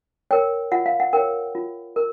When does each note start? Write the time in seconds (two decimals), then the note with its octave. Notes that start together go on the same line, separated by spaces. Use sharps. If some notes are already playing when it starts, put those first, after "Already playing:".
0.31 A#4 C#5 G5
0.72 F4 F#5
0.86 F5
1.00 F#5
1.13 A#4 C#5 G5
1.55 F4
1.96 A#4